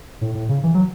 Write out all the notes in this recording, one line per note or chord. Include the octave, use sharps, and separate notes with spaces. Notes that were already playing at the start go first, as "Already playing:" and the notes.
A2
A2
C#3
E3
F#3